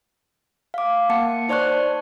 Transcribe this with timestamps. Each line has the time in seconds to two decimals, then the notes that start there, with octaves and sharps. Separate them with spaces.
0.74 F5 D6
1.10 A#3 F#5 A5 C#7
1.49 D#4 C5 D5 A5 C#6 F#6